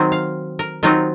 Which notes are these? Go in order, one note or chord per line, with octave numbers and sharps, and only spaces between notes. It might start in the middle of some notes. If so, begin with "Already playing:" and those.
Already playing: D#3 F#3 C4 D#4
F5
A#4
D#3 F#3 C4 D#4 F4